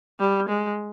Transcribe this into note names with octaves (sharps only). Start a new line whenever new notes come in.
G3
G#3